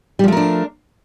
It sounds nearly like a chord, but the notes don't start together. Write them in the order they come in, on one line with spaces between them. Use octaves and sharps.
G3 F3 A3 A#4 D4